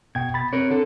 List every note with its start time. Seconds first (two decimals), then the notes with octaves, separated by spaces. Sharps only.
0.15 G#1 B2 G5 G#6
0.34 B5 A6
0.53 C4 A#4 C#5
0.70 D3 A4